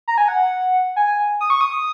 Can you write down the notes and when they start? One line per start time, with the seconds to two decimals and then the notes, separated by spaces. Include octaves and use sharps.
0.08 A#5
0.18 G#5
0.28 F#5
0.96 G#5
1.41 D#6
1.50 C#6
1.61 D#6